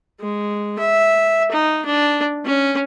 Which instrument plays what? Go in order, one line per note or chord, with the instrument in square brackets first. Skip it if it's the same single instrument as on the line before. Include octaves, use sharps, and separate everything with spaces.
[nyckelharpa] G#3
E5
D#4
D4
C#4